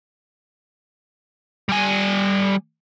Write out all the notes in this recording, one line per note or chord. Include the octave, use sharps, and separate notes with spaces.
G3 G#5